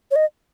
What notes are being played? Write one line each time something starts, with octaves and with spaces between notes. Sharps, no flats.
C#5
D#5